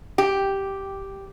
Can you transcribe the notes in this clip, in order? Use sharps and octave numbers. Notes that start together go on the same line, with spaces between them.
G4